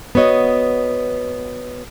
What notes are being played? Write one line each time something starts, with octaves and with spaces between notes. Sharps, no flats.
B3 F#4 C#5 D#5